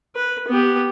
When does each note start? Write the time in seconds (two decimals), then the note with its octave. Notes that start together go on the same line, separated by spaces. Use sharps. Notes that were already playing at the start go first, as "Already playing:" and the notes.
0.16 B4
0.48 B3 G4